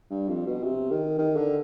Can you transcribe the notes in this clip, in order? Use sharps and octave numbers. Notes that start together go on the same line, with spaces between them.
G2
F2
B2
C3
D#3
D#3
D3